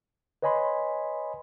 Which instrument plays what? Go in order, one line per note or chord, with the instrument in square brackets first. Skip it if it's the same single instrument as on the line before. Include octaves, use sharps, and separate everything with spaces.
[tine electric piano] B4 C#5 D#5 G#5 B5 C6